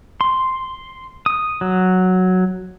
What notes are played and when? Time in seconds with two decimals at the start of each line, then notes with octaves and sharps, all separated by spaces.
0.21 C6
1.26 D#6
1.61 F#3